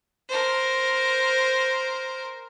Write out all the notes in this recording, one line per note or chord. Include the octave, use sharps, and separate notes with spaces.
A#4 C5